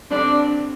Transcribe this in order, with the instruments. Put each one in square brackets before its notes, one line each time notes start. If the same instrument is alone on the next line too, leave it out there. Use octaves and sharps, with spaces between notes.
[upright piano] G2 D3 G3 C4 [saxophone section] D4